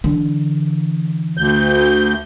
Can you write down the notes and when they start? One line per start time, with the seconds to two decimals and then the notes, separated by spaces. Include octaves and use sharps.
0.04 D3 E3
1.37 D2 G6